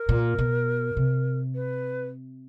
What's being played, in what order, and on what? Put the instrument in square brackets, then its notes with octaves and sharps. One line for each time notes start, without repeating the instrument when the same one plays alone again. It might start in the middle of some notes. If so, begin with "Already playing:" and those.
Already playing: [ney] A#4
[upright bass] A#2
B2
C3
[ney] B4